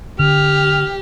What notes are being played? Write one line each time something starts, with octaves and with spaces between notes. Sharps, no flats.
D3 G4 F6